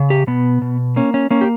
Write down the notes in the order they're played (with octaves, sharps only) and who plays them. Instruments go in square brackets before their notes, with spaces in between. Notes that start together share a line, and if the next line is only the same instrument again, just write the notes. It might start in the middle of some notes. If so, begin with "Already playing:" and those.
Already playing: [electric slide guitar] C#3
G4
B2 B3
B2
A#3 C#4
C#4
A#3 C#4
G4